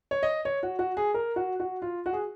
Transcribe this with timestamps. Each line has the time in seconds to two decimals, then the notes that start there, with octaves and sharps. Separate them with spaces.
0.11 C#5
0.23 D#5
0.45 C#5
0.63 F#4
0.79 F#4
0.97 G#4
1.14 A#4
1.36 F#4
1.60 F#4
1.82 F4
2.06 F#4
2.13 G#4